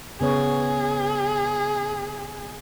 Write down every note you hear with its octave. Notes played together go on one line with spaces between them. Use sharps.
C#3 B3 G#4 C#5